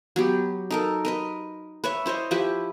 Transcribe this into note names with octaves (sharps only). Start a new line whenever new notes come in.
F#3 B3 G4
D#4 A4 A#4
A#4 B4 D#5
B4 C#5 E5
E4 C5 C#5 D#5
F3 E4 G4 B4